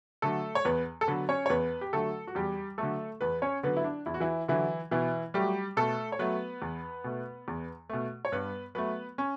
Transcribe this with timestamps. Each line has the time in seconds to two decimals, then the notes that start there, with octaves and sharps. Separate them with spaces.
0.22 D3 F#3 A3 A4
0.55 C#5
0.65 E2 B3 B4
1.01 A4
1.08 D3 F#3 B3 B4
1.29 C#4 C#5
1.46 C#5
1.50 E2 B3 B4
1.81 G4
1.93 D3 F#3 A3 A4
2.27 F#4
2.35 E2 G3 G4
2.78 D3 F#3 A3 A4
3.21 E2 B3 B4
3.42 C#4 C#5
3.63 D3 F#3 B3 B4
3.77 E4
3.84 D4
4.06 E2 E4
4.14 F#4
4.20 E3 E4
4.48 D3 E3 F#3 E4
4.91 B2 E3 E4
5.34 F#3 G3 A3 G4
5.77 B2 A3 A4
6.12 C#5
6.19 F#3 A3 B3 B4
6.62 E2
7.04 B2 A3
7.48 E2
7.90 B2 A3
8.25 C#5
8.32 G2 B3 B4
8.75 F#3 A3 B3 B4
9.18 C#4